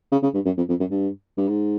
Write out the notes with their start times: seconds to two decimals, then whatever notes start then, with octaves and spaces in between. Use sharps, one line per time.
0.12 C#3
0.23 C#3
0.34 G2
0.46 F#2
0.57 F2
0.69 F2
0.80 F#2
0.91 G2
1.38 G2
1.48 G#2